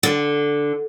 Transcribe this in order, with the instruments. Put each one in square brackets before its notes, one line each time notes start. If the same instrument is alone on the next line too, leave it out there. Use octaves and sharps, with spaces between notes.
[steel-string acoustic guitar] D3